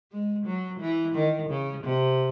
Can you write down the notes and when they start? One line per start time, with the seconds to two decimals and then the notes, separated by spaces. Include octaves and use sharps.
0.12 G#3
0.46 F#3
0.80 E3
1.15 D#3
1.49 C#3
1.83 C3